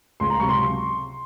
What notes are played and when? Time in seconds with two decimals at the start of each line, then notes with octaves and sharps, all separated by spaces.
0.20 C#2 C6
0.30 A#5
0.39 C3 F#3 C#6
0.49 C6